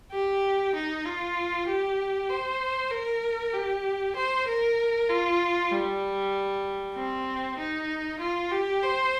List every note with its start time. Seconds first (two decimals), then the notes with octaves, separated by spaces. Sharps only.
0.12 G4
0.75 D#4
1.05 F4
1.67 G4
2.29 C5
2.91 A#4
3.53 G4
4.15 C5
4.48 A#4
5.09 F4
5.71 G3
6.95 C4
7.58 D#4
8.20 F4
8.51 G4
8.83 C5